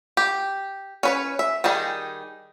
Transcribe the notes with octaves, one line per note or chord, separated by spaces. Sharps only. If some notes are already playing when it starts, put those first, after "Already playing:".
G4
C#4 B4 C#5
E5
D#3 G3 D#4 G#4